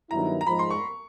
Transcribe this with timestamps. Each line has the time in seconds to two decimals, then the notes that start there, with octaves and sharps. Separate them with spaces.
0.10 G2 D#3 F#3 B3 E4 A#5
0.41 A#5
0.46 G#2 F3 G#3 B5
0.59 C6
0.70 C#6